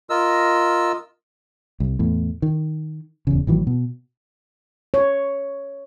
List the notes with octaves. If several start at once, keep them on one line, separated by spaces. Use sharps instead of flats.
F4 A#4 D#5 E6
C2
E2 A2
D#3
D1 E2 C#3
A1 D#3 E3 F#3
B2
C#5